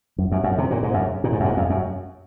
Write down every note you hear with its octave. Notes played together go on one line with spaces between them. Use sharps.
F#2
F#2
F#2
C3
A#2
G#2
F#2
A#2
G#2
F#2
G#2
F2
F#2